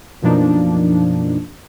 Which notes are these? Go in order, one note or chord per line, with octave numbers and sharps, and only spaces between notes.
F#2 B2 F3 A#3 D4 D#4